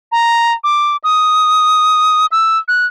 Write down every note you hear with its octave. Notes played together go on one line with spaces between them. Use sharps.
A#5
D6
D#6
E6
F#6